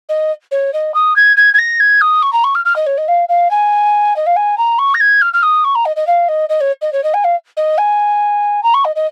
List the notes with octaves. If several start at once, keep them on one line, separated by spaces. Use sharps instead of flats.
D#5
C#5
D#5
D#6
G#6
G#6
G#6
A#6
G#6
D#6
C#6
A#5
C#6
F6
F6
D#5
C#5
D#5
F5
F5
G#5
D#5
F5
G#5
A#5
C#6
A#6
G#6
F6
F6
D#6
C#6
A#5
D#5
D#5
F5
D#5
D#5
C#5
D#5
C#5
D#5
G#5
F5
D#5
G#5
A#5
C#6
D#5
D#5